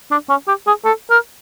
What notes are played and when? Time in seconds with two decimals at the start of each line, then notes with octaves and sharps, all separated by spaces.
0.11 D4
0.29 C#4
0.48 G4
0.67 G#4
0.85 A4
1.10 A#4